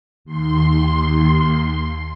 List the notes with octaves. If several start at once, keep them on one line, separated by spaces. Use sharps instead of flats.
D#2 C6